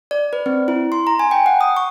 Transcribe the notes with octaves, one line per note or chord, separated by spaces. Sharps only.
D5
B4
C4
E4
C6
A#5
G#5
G5
F#5
D#6
C#6